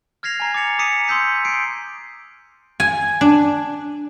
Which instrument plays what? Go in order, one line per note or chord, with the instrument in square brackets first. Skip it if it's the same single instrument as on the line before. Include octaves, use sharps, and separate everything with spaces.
[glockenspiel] F6 G#6 A#6 C7 F7
G#5 A#5
D6 A6 C#7 F7
A#5 D6 D#6 B6 C#7 D#7
C6 D#6 E6 G6 B6
G6 C7 D7
[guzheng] G#5
D4